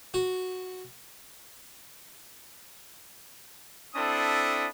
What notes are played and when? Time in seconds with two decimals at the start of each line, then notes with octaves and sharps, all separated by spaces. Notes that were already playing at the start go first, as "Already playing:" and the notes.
0.14 F#4
3.95 C4 D4 E4 A4 B5 D#6